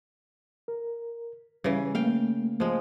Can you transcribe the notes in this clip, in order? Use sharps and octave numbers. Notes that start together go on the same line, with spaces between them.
A#4
C#3 E3 G3
A3 A#3 F5 G5
F3 G#3